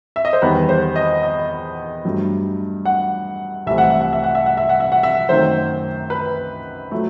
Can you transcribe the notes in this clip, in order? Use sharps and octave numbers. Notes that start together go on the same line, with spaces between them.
E5
D#5
C5
E2 D#3 G3 B3 B4
C5
D#5
D#5
G2 F#3 A3
F#5
C2 C3 E3 A3 C4 E5
F#5
E5
F#5
E5
F#5
E5
F#5
E5
F#5
E5
F#5
E5
F#2 D#3 A3 C4 C5
B4
F#3 A3